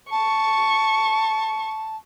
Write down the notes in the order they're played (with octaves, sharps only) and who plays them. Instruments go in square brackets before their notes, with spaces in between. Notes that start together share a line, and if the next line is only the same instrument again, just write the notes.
[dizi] A5 [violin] C#6